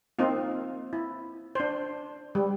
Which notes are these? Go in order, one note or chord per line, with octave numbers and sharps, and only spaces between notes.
A#3 C4 D#4 F4
E4
D4 C5
G3